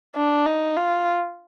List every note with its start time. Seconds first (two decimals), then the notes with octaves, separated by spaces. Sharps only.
0.15 D4
0.46 D#4
0.77 F4